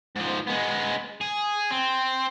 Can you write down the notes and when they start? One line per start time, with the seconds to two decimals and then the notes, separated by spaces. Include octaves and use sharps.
0.16 G#2 F3
0.47 G#3 B3
1.21 G#4
1.71 C4